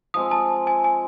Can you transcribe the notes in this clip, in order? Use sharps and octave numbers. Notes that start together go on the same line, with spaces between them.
F3 G#3 C4 D#6
A5
G#5
G#5